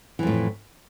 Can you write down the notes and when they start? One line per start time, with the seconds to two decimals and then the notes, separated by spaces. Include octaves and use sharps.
0.19 E3
0.23 F2
0.27 A2